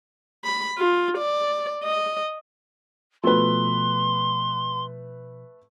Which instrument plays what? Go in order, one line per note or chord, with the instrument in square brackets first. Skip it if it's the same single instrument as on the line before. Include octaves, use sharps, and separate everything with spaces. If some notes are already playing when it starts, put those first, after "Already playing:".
[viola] B5
F4
D5
D#5
[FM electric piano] B2 F3 [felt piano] A3 B4 [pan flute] C6